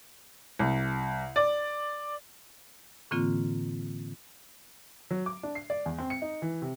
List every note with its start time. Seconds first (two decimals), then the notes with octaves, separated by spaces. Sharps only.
0.59 C2
1.36 D5
3.11 A2 D3 E3 A#3 C4 F4
5.11 F#3
5.26 D6
5.43 D4
5.55 C7
5.70 D5
5.86 E2
5.98 C4
6.10 C#7
6.22 D#4
6.42 E3
6.62 C3